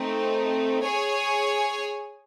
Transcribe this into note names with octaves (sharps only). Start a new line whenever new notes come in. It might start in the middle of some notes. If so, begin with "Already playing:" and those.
Already playing: A3 C4 D#4
G#4 C#5 G#5